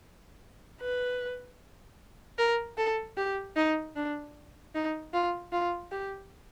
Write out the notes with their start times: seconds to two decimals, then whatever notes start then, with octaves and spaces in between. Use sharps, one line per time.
0.81 B4
2.38 A#4
2.77 A4
3.17 G4
3.56 D#4
3.96 D4
4.75 D#4
5.14 F4
5.53 F4
5.92 G4